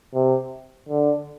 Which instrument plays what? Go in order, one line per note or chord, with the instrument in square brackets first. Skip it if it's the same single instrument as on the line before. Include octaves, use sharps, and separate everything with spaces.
[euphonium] C3
D3